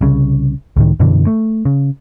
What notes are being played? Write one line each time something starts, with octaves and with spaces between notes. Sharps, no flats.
C2 C#3
C#2 A2 D#3
F#2 B2 D3 E3
A3
C#3